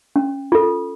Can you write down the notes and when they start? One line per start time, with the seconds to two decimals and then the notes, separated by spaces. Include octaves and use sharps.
0.16 C#4
0.52 F4 A4